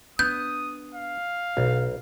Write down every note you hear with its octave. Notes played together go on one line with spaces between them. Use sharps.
B3 D4 D#6 G6
F5
B1 B2 E4